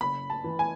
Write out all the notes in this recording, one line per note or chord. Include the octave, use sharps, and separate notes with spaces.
F#1 B5
A5
E3
G#5